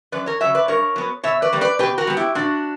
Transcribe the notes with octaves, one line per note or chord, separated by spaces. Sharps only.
F#2 B4 D5
A#4 C#5
C#3 F#3 C#5 E5
B4 D5
G2 A#4 C#5
F#3 B3
B2 C#5 E5
B4 D5
G3 A#3
B4 D5
B2 G4 B4
F#4 A#4
G3 B3
E4 G4
A#2 D4 F#4